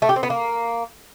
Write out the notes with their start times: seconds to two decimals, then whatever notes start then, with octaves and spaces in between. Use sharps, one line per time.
0.02 A3
0.09 G4
0.16 C4
0.23 B3
0.30 A#3